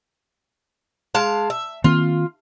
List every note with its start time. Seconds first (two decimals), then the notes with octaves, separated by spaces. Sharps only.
1.14 G#3 F5 A5
1.50 E5
1.84 D#3 A#3 C4 F4